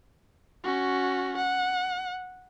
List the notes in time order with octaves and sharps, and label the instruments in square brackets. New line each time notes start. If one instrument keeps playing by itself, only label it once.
[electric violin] C#4 F#4
F#5